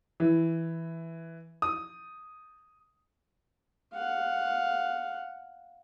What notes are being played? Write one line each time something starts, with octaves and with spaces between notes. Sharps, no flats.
E3
D#6
F5 F#5